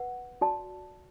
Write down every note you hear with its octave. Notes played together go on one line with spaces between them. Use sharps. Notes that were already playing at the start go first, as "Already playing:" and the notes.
Already playing: B4 F#5
F#4 D5 A5